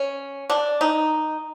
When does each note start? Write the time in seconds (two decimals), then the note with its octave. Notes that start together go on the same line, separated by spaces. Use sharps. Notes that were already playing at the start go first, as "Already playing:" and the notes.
Already playing: C#4
0.50 D4
0.81 D#4